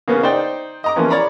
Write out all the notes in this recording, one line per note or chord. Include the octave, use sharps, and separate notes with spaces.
C#3 A#3 B3 C#4
D#4 C5 D5 G5
D#5 A#5 D6
E3 F3 A#3 B3 C#4
C#5 D5 A#5 B5